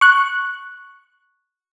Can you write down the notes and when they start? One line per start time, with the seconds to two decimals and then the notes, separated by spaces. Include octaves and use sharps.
0.01 C#6 F#6